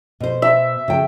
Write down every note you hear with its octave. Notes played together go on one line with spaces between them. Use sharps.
B2 C5
E5
C#3 G5